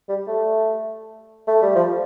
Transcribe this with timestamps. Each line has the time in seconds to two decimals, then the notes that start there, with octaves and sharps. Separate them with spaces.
0.08 G3
0.28 A3
1.47 A3
1.62 G3
1.75 F3